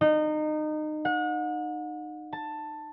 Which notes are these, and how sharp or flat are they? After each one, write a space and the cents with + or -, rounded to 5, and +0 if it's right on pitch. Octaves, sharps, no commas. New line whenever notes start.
D#4 -25
F#5 -35
A5 +10